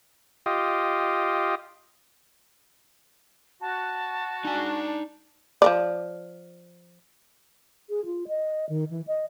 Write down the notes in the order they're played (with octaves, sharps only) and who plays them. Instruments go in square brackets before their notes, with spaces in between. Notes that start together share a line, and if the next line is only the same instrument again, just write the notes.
[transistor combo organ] F4 G4 D#5
[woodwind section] F#4 [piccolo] A5
[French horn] D4 [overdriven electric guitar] D#4 G#5
[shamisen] F3 A#4 D5
[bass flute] G#4
F4
D#5
D#3
E3
D#5